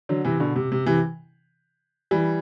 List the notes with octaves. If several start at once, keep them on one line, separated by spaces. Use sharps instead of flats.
D3 F#3
C3 E3
B2 D3
C3
C3
C3 E3
E3 G3